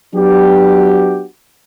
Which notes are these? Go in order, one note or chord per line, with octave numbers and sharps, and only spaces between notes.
F#3 B3 D4 F#4 G4